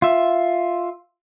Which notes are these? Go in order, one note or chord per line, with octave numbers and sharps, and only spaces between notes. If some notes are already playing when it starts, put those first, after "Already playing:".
F4 E5